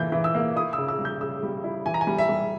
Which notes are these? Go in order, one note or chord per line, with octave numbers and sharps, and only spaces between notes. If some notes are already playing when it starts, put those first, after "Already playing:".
Already playing: E3 A#3 G6
E3
E6
A#3
E4 D#6
E6
C#3
E6
G3
G6
C#3 E6
G3
E4
E3 G#5
A#5
G#5
G3
E5
G3